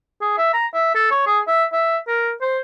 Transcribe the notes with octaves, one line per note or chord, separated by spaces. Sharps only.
G#4
E5
A#5
E5
A4
C#5
G#4
E5
E5
A#4
C5